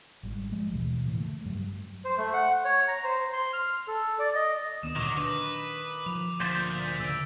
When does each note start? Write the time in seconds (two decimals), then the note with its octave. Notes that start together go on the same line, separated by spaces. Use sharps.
0.23 G#1 G3
0.52 F3 G#3 A3
0.73 D#2 B2 E3
1.05 A2 C#3 E3 A3
1.20 A3
1.45 G2 F#3 G3
2.05 C5
2.17 A3
2.34 F#5
2.65 C#5
2.88 A#5
3.04 C5
3.33 C6
3.53 F6
3.88 A4
4.19 D5
4.35 D#5
4.83 D2 D#3 B3 D#6 D#7 E7
4.96 D2 A#2 D#3 F#3 D6
5.17 D4 B4 D#6
6.06 F3 F7
6.40 D2 A#2 C5 G6 A6 B6
7.00 C#3 E6 D7